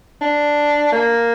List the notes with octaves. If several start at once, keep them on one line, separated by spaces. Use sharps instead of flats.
D4
A#3